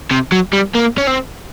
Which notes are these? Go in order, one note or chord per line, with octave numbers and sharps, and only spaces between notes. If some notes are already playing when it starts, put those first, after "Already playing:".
C3
F#3
G3
A#3
C#4
C4